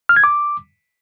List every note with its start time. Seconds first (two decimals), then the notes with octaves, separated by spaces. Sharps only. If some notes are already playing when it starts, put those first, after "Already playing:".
0.09 F6
0.16 G#6
0.24 D6